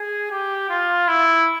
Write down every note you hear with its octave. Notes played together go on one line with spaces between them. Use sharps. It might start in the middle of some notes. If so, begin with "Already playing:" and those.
Already playing: G#4
G4
F4
E4